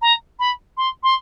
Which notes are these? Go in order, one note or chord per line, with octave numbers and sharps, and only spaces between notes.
A#5
B5
C6
C6